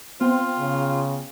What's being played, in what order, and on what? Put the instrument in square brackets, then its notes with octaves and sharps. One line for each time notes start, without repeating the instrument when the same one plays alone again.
[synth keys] B3 G5 [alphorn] C4 [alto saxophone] F4
[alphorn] C#3